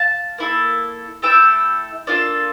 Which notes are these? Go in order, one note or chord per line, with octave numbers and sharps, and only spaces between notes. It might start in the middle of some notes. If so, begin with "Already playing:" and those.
Already playing: F5 A5
A#3 E4 A4
A3 E4 A4 E5 G5
A#3 D4 F4 A4 D5 F5